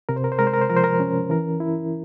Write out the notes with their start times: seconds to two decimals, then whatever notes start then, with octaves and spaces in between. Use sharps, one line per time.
0.09 C3 A#4
0.16 C5
0.24 A#4
0.32 C5
0.39 G#3 A#4
0.47 C5
0.53 A#4
0.61 C5
0.69 F3 A#4
0.77 C5
0.84 A#4
1.00 C#4
1.30 E3 A#4
1.60 E4